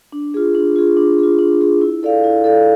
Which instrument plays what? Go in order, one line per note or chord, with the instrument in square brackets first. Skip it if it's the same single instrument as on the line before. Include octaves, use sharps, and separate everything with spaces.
[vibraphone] D4
F4 G#4
D4
F4 G#4
D4
F4 G#4
D4
F4 G#4
E4
A4 D5 F5
E4
A4 D5 F5